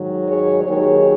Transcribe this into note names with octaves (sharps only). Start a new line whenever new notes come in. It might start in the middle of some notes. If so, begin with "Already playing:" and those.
Already playing: G#2 D#3 F#3
G#4 C#5
D#2 D#3 F#3 G#4 C#5